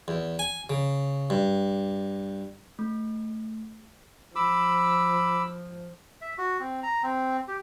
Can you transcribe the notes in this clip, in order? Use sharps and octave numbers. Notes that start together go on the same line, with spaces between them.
E2
G#5
C#3
G2
A3
F3 B5 D6 E6
E5
F#4
C4
A#5
C4
G4